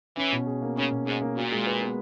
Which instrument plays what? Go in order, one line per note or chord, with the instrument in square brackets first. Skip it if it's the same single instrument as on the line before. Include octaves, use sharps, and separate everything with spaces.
[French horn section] E3 [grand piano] C#4
[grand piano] B2
G#4
A#3
[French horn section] C#3 [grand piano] C#4
[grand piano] B2
[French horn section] G#2 [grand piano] G#4
[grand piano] A#3
[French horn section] A#2 [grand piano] F#4
[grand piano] G#3
B4
B3